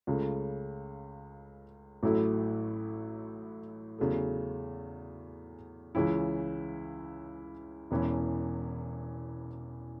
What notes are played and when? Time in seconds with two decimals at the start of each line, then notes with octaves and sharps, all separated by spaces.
0.07 C#2 C#3 A3
2.03 A1 A2 F#3 A3 E4
3.98 E2 C#3 F#3 A3
5.95 C#2 C#3 E3 C#4 E4
7.91 E1 E2 E3 C#4 E4